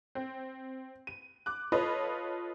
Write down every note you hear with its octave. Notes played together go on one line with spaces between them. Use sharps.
C4
D#7
D6 F#6
F4 A4 B4 C#5 D#5